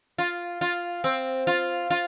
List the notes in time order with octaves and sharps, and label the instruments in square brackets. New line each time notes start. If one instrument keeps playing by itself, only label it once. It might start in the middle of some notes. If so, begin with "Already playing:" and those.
[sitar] F4
F4
C4
F4
F4